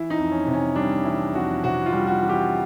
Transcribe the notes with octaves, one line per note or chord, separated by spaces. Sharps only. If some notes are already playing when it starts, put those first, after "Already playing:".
Already playing: E3 E4
D#4
F2
C#4
C3
C#4
G3 D4
E3 E4
F2 F#4
C3 F#4
F4
G3
F#4
E3
G4